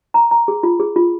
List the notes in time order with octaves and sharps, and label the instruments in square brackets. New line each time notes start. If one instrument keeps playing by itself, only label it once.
[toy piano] A#5
A#5
G#4
F4
G#4
F4